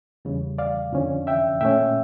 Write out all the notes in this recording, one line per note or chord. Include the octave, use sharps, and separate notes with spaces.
E2 C#3 G3
D5 F5
F2 D3 F3 C#4
E5 G5
A#2 A3 C#4 E5 G5